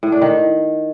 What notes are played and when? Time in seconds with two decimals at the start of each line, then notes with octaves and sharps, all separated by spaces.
0.03 A2
0.12 D4
0.22 D#3